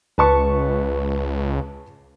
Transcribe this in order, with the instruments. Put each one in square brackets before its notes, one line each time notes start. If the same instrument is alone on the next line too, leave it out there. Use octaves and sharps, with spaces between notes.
[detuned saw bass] C#2 [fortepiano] B4 A5 C#6